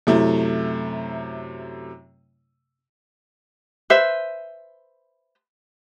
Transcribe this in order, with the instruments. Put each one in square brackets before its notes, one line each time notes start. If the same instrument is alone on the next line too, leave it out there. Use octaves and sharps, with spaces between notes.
[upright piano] F#2 C3 A3 E4
[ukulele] B4 C5 E5